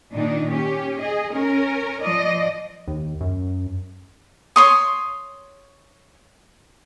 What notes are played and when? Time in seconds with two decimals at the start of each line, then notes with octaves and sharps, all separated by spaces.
0.13 A#2 D#3 D4 D#4
0.50 C#4 G4
0.98 G#4 D#5
1.34 C#4 A#4
2.04 F3 D5 D#5
2.88 D#2
3.21 F#2
4.56 C#5 C6 D#6